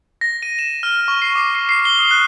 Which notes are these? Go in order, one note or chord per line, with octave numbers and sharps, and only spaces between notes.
A#6
D#7
E7
F6
C#6
C7
D6
C7
C7
G7
D#6
F#6